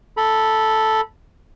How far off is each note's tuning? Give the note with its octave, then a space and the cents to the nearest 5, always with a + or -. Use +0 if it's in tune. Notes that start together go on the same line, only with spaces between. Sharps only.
A4 +0 B5 -20